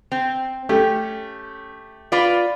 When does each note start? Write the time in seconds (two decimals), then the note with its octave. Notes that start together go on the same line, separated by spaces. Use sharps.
0.12 C4
0.69 A3 C#4 G4
2.12 F4 B4 D5